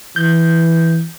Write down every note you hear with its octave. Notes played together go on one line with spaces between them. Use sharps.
E3 G6